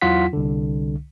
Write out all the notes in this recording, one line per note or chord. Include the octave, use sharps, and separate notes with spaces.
E2 F#3 E4 F4 F#5 B6
C2 D3